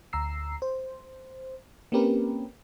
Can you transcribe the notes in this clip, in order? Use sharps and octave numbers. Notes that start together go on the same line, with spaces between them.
D2 A#5 E6 C7
C5
A#3 C4 C#4 G4 A#4 B4